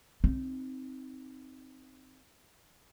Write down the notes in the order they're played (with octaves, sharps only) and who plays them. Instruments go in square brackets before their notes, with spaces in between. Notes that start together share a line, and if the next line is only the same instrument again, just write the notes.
[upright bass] C4 D#4